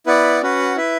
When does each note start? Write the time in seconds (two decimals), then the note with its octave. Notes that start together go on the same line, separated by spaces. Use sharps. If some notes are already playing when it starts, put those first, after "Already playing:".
0.06 B3 E4 B4 D5 F#5
0.42 C#4 F#4 B4 F#5
0.76 E4 B4 E5